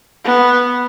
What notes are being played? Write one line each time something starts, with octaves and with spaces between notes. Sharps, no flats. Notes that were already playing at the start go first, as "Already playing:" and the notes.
B3